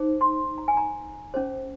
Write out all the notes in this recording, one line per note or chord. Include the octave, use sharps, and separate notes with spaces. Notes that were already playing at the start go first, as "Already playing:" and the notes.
Already playing: D#4 G#4 C5
C6
A#5
G#5
A#5
C#4 G#4 C5